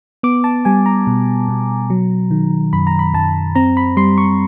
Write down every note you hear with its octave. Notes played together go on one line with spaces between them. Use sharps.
B3 D6
A5
G3 G#5
A#5
B2
B2
F#3
D#3
F#2 B5
A#5
B5
F#2 A5
C4 A#5
B5
G3 C6
C#6